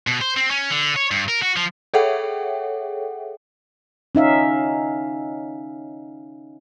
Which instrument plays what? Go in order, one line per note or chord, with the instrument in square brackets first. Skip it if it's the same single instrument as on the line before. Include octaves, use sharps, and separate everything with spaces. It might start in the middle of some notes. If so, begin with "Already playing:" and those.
[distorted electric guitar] B2
C5
C4
C#4
D3
C#5
G2
A#4
F#4
F3
[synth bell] G#4 A4 C#5 E5 F#5 G5
[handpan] C#4 D#4 E5 F5